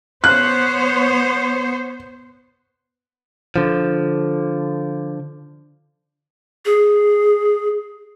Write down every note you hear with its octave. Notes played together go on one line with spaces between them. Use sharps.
B3 C5 C#5 F#6
D3 F3
G#4